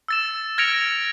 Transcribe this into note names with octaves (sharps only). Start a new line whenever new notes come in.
E6 A6 E7
F6 G#6 A#6 C#7 D7 F7